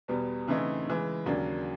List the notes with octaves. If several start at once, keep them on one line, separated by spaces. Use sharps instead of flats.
E2 B2 G3 B3
C#3 E3 A3 C4 D#4
C#3 E3 G#3
D#2 C#3 F#3 A#3 D4